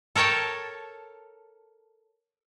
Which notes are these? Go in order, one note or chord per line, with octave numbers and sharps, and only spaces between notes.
A4 A#4 C#5 G5 A5